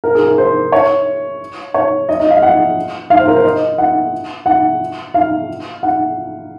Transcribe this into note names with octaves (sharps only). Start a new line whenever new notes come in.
A#4
G#4
A#4
C5
C#5
C#5
D#5
D#5
F5
F#5
F5
C5
A#4
C5
D#5
F#5
F#5
F5
F#5